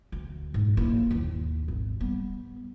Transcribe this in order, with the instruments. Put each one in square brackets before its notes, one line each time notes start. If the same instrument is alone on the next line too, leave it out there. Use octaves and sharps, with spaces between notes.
[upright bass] D2
G#2
A#3 E4
D#2
G#1
G3 B3